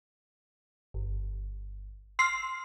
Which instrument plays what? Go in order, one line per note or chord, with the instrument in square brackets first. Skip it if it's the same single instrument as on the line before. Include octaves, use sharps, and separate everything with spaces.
[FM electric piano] G1
[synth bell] C6 C7 [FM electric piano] E6 F6